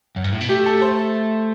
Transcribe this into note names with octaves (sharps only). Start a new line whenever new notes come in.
F#2
G2
A2
B2
A3 G4
A4
C5